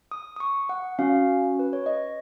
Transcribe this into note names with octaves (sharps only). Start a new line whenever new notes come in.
D#6
D#6
C#6
F#5
C#4 F#4 F5
B4
C#5
D#5